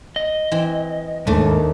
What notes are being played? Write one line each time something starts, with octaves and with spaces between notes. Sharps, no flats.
D#5
E3 C4
D#2 G#2 A3 D4